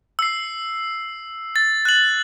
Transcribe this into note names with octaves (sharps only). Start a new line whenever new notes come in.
E6 C7
A6
F#6 F#7